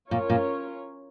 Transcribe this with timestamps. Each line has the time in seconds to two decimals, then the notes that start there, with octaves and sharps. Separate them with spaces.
0.11 A#2 C#4 F4 A#4 C#5
0.30 A#2